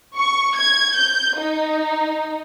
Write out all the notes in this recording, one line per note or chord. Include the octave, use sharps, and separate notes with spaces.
C#6
G#6
G6
D#4